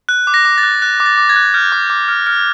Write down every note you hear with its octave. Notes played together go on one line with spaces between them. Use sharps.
F#6
D6
A#6
D6
A6
F#6
F#6
D6
A6
D6
G#6
F#6
F6 G6
D6
D6
F6
F6